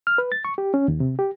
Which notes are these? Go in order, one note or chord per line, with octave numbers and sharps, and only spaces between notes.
F6
B4
A6
C#6
G4
C#4
D#2
C3
G4